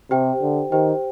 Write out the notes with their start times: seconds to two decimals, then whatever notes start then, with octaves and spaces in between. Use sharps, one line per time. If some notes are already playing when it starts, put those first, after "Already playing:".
0.11 C3 G4 C5 G5
0.41 D3
0.71 D#3 G4 C5 G5